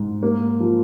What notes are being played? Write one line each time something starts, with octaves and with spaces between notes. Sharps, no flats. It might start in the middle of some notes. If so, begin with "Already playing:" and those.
Already playing: G#2
A#3
F3